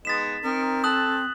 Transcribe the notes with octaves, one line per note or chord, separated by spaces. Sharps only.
G#3 B3 D#4 A6 B6 E7
C4 D#4 A#4
A4 D#6 F#6 F#7